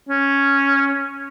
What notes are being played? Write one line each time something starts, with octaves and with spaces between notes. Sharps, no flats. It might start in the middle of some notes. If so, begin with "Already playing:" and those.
C#4